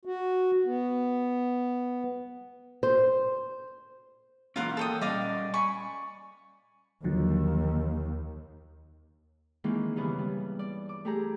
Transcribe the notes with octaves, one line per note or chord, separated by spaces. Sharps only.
F#4
B3
C5
E3 A#3 C#4 F4 A#4 F#5
A4 G5 D#6
G3 C#4 D5 D#5 F5
G#5 B5 C#6
D#2 D3 F3 F#3
D#3 E3 G#3 A#3 C4
G2 C#3 E3 B3
G3
D5
D6
A3 G4 G#4 A#5